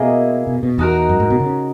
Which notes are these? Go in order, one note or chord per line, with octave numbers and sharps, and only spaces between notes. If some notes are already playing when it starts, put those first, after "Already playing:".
Already playing: B2 A#3 E4 G#4 D#5
B2
B2
E2 D#4 F#4 A#4
F#2
G#2
B2
C#3